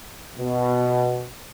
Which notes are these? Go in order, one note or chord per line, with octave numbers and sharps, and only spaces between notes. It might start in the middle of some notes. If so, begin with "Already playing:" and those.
B2